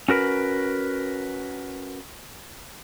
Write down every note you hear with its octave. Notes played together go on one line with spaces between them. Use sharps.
C#4 F#4 A#4 B4